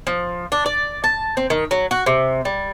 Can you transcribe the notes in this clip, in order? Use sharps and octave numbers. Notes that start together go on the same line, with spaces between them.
F3
D4
D5
A5
C4
D#3
F#3
F#4
C3
G3